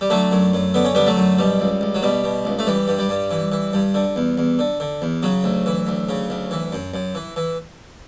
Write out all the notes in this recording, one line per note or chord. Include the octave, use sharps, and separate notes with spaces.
G3
D3 F#3 A3
F#2
F#2
D3 B3
C#4
D3 G3 B3
F#3 A3
F#2
B2 G3
C#2
C#2
F#3
B2 G3
B2
C#2
A3
E3 G3
G2
G3
G2
E3
E3
G2
D3
E2
E2
D3
D3
E2
C#3 F#3
D2
E3
D2
C#3
D2
E3
F#2
F#2
E3
E3